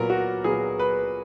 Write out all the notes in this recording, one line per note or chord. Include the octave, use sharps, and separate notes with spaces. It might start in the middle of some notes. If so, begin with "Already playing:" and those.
Already playing: A#2 F#3 B3 A#4
F#4
A#2 F#3 B3 G#4
B4